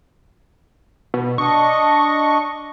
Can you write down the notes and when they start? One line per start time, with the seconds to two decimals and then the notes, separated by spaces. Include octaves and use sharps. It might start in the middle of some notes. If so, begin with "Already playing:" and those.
1.14 B2
1.38 D4 D#5 C#6